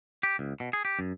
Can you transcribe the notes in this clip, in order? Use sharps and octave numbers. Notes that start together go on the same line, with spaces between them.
G4
C#2
B2
G#4
G4
F#2